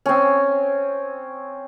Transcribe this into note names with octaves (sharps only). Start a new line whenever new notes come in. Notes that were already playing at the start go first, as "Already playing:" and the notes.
C4 C#4